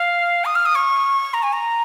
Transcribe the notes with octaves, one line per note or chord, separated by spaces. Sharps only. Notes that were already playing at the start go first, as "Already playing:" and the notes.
Already playing: F5
D#6
F6
D#6
C#6
A#5
G#5
A#5